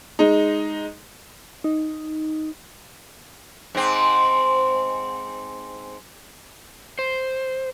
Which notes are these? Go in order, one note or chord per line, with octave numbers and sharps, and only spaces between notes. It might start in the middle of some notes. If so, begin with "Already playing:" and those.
G#3 D#4
D#4
G#2 C4
C5